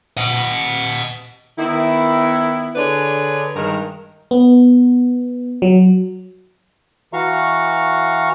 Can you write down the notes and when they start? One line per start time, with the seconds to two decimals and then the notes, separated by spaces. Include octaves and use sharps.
0.17 D#5 F#5
1.58 D#3 B3 E4
2.75 D3 D4 G#4 B4 C#5
3.55 G2 D#3 G#3 A#4
4.31 B3
5.62 F#3
7.13 E3 F#4 F5 A#5 C#6